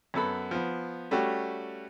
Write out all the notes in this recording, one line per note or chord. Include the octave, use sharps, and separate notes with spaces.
F#2 B3 A4 B5
F3 B3
G3 A3 C#4 F#4 G4